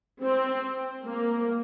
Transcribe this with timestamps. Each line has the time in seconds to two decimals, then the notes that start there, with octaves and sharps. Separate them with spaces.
0.22 C4
1.04 A#3